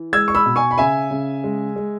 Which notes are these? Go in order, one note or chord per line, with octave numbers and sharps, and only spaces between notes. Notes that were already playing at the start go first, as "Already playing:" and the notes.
Already playing: E3
G#3 E6 G#6
C#6
B5 E6
B2
G#5 C#6
B5
C#3 E5 G#5
C#3
G#3
G#3